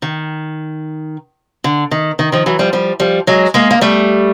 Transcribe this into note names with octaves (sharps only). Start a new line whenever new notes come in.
D#3
D3
D#3
D#3
D#3 F3
E3 F#3
F3 G3
F3 G3
F3 G3
F#3 G#3
G#3 A#3
A#3
G3 A3